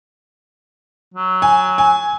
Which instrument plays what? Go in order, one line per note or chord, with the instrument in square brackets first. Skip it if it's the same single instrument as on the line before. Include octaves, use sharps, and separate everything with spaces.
[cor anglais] F#3
[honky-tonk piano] G#5
G#5